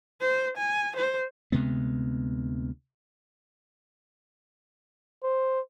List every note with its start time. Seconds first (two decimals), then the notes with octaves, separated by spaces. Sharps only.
0.21 C5
0.57 G#5
0.97 C5
1.52 D2 C3 G#3 B3
5.23 C5